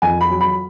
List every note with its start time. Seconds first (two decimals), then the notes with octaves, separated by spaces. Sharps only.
0.02 F2 G#5
0.21 B5
0.30 F#3
0.41 B5